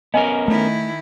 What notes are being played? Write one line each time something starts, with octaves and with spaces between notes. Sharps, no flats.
B3 C#4 A#4 D#5 G#5
D#3 A3 E4